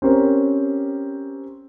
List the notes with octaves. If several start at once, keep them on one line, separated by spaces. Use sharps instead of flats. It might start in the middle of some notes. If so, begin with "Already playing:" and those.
C4 C#4 G4 A#4 C5